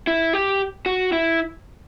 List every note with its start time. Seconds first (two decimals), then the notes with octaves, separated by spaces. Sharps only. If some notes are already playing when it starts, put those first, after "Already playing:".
0.07 E4
0.33 G4
0.86 F#4
1.12 E4